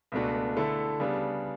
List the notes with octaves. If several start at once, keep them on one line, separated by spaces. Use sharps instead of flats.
C#2 B2 A3 D4 F#4
D3 A3 E4 A4
C#3 G3 B3 D4